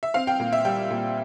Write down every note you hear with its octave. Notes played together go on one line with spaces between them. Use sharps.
E5
C4 F5
G5
A#2
E5
G3 G5
A#2